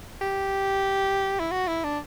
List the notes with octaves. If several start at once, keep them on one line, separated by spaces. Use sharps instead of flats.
G4
E4
F#4
E4
D4